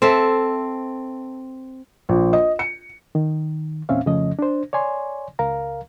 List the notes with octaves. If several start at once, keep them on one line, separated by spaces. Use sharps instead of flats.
C4 A4 E5
A#1
D#5
C#7
D#3
E2 A#2 C4 C#4 E5 F5
F2 C#3 F3 A3 C#4 D#5
D4 C5
C#5 D5 G#5 C6
C#2 A#4 F5 A#5